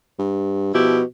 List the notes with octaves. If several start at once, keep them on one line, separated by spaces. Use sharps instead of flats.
G2
B2 F3 E4 G4